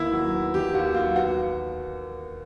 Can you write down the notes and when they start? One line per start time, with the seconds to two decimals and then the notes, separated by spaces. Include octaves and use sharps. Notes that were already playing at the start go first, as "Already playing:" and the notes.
Already playing: D#2 D#3 B3 E4
0.13 F#3
0.34 B3
0.54 D#3 G4
0.74 D#2 F#4
0.94 F#3 F4
1.15 B3 F#4